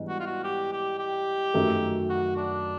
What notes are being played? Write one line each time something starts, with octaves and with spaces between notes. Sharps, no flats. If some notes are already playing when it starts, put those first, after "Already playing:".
Already playing: G#2 E3 G3 B3 D4
F#4
F4
F#4
G4
G4
G4
F#2 D#3 F#3 A3
F#4
D4